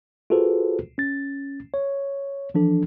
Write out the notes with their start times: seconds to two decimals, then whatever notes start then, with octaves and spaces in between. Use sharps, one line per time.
0.30 F4 F#4 G#4 A4 B4 C5
0.98 C#4 A6
1.74 C#5
2.54 E3 F3 D4 A4